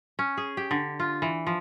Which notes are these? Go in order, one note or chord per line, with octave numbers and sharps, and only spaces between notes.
C#4
G#4
G4
D3
F4
E3
F3